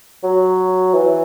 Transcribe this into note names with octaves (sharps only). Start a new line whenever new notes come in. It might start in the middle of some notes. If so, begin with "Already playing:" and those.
F#3
E3